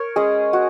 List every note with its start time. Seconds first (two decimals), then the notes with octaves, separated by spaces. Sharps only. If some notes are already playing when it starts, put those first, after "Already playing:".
Already playing: A#4 C#5
0.16 G#3 C#4 G#4 D#5
0.53 F#4